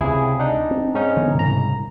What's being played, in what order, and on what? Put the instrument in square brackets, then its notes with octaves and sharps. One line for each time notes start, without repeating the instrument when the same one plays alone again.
[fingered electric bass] C#2 C3 [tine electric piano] E4 G#4
[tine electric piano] D4 D#4
[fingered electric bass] C4
[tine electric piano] G#2 C#4 D#4
[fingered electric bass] D3 E3 B3
[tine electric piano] C2 A#5 [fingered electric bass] G#2 C#3